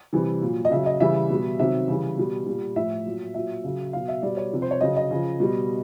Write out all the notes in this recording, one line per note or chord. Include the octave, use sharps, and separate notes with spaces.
C3 E3 G3
A#2 F#3
D#5
C#3 F#3 E5
D#5
C#3 E3 G3 E5
B2 G3
C3 D#3 F#3 E5
C#3 E3 G3
B2 G3
A#2 G3
A2 F3 E5
A#2 F#3
A#2 F#3 E5
C#3 F#3
B2 F#3 F5
E5
B2 G3 D5
C#5
C3 F3
C5
C#5
C#3 F#3 D#5
D#5
C#3 F3
B2 G3